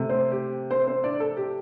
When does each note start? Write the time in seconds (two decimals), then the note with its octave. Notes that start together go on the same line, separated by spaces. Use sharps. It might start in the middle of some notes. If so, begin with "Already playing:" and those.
Already playing: C3 A3
0.09 C4 C5
0.32 G4
0.70 C4 C5
0.87 C4 C5
1.04 D4 D5
1.20 A4
1.37 G4